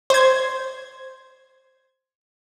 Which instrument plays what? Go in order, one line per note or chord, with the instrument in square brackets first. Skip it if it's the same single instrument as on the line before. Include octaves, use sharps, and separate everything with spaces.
[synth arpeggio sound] C5 G#6